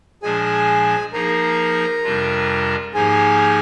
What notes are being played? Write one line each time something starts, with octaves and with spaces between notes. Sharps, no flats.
A#2 F3 G#3 D4 G#4 G#5
F3 A#3 D#4 G#4 A#4 A#5
F2 C3 G3 D4 F4
G#2 F3 A#3 D#4 G4 G#4 G#5